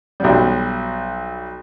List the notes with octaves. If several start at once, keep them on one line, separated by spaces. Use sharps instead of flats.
B1 F#3 G3